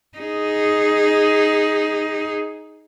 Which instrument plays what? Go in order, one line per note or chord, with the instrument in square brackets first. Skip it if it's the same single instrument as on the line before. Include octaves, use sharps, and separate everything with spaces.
[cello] D#4 G#4